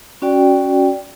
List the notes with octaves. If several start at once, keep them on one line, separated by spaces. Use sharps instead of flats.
C#4 F#4 D5 G5